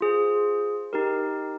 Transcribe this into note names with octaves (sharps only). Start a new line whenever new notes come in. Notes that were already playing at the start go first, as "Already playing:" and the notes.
F4 G#4 C5
D#4 G4 A#4